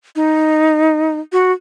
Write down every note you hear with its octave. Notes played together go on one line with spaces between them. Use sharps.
D#4
F#4